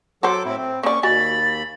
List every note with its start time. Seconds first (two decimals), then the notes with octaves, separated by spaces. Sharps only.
0.23 F#3 F#4 A4 C5 D6
0.45 A2 C4 E4
0.57 C4
0.83 A#3 C#4 D5 C#6
1.03 D#2 F#4 D#5 G#5 B5 A6